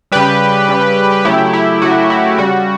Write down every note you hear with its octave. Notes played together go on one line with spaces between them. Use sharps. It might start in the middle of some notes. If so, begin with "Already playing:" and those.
C#3 G3 G4 B4
C#3 G3
C#3 F#3 A3 E4 G4
E4
C#3 F#3 A3 F#4
E4
C#3 G3 F#4